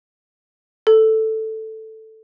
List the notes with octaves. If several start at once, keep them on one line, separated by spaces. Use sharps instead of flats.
A4